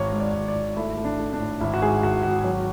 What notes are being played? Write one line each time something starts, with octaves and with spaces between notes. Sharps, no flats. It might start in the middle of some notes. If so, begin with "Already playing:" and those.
Already playing: G#1 C#5
G#2
D5
G#1
D5
G#1
A3 E4
A3
D4
A3
D4
A2
G#1 E4
F#4
G#2 G#4
G#1 F#4
G#1 F#4
F#3